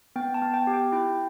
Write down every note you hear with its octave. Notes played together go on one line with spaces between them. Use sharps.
B3 G5
A5
B3
G5
G4
G5
E4 G5